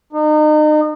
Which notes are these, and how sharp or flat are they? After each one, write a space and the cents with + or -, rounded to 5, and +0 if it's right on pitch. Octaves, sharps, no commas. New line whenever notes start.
D#4 -35